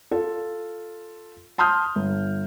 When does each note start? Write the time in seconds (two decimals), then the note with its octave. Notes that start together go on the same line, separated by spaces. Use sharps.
0.11 F4 A4
1.58 A5 C6 D#6 F6 G6
1.95 G1